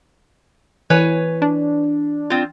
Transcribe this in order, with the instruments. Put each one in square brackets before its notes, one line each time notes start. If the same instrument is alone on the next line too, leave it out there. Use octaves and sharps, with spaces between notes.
[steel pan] E3 [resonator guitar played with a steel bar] B4 C#5 G#5
[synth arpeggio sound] D4
[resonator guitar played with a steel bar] C4 F4